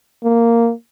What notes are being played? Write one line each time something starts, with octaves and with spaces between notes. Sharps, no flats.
A#3